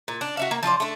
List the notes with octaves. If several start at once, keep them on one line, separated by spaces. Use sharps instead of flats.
A#2
D4
F#4 E5 F5
A#3
F3 F4 C5 D5
A3 D4